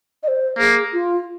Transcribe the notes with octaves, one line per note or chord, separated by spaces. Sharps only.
D#5
C5
A#3 G#4
F4